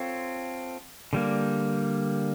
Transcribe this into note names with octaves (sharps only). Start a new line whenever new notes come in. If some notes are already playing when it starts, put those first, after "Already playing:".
Already playing: C4 F4 A4 C#5
D3 G3 A#3